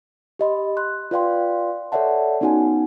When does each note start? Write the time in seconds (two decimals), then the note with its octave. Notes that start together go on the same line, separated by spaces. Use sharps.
0.39 G4 D#5 B5 C6
0.77 C6 F#6
1.11 F4 B4 D5 F5 G5 C6
1.92 A4 C#5 D5 E5 F#5 A5
2.41 B3 C#4 D#4 F#4 F#5 G#5